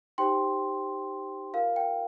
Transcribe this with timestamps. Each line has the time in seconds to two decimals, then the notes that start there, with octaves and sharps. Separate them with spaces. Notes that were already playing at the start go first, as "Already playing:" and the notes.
0.18 D#4 G4 C5 G5 C6
1.54 F4 A#4 F5
1.76 G5